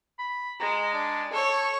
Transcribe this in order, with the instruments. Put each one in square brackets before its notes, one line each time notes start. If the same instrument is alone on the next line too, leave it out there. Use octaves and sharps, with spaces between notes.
[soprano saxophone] B5
[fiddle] G#3 [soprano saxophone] A#5
[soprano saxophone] D4
[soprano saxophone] A4 [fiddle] C#5 C#6